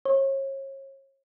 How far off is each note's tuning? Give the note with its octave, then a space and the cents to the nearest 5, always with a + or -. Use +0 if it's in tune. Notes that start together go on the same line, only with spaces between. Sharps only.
C#5 -35